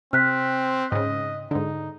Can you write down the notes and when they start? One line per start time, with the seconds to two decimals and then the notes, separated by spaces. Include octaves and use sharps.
0.13 C3 C4 F6 F#6 B6
0.92 G#2 C#3 D#5
1.51 G#2 D3 D#4